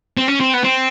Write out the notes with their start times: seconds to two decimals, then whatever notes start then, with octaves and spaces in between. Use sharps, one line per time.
0.17 C4
0.28 C#4
0.40 C4
0.54 B3
0.64 C4